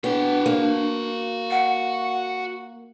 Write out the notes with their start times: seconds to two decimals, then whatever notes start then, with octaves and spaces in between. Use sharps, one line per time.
0.04 B3 D4 F#4 G5
0.46 A#3
1.51 F#5